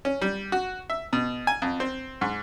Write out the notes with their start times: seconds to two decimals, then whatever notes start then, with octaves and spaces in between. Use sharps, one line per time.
0.05 C#4
0.21 G3
0.52 F#4
0.90 E5
1.13 B2
1.47 G#5
1.62 F2
1.80 C4
2.21 G#2